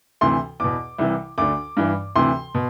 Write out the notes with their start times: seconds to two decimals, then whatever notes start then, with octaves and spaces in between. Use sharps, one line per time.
0.21 D2 C3 E3 C6
0.60 E2 B2 D6
0.98 C2 C3 E3
1.38 D2 D3 D6
1.77 G2 E3
2.16 D2 C3 E3 C6
2.55 B2